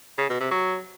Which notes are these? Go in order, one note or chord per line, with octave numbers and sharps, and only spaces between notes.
C#3
B2
C3
F#3